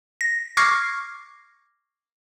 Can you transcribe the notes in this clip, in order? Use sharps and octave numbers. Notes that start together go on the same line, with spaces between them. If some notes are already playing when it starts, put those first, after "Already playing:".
A#6
C#6 D6 F6 G#6 A#6 C7